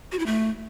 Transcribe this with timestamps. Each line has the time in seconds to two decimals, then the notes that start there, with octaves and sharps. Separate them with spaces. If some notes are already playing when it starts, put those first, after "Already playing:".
0.12 F#4
0.19 E4
0.26 A3